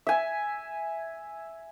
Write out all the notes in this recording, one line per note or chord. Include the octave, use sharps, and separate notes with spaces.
E5 G#5